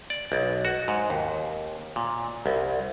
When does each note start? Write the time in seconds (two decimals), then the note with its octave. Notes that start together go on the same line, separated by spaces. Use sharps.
0.10 D5
0.32 B1
0.65 F#4
0.88 G#2
1.10 D#2
1.96 A#2
2.46 C2